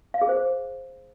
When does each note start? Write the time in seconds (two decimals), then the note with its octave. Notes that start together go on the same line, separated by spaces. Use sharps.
0.14 F5
0.21 G#4
0.29 C5